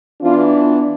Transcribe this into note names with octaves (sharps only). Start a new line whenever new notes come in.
E3 B3 D4 F4